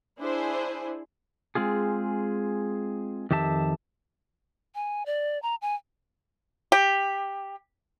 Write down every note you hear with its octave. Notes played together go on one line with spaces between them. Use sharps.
D4 E4 G#4 C5
G#3 C4 F4 G#4
F2 D#3 G4 E5 A5
G#5
D5
A#5
G#5
G4